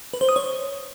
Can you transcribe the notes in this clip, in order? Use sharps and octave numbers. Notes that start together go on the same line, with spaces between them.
B4
C5
D#6
C#5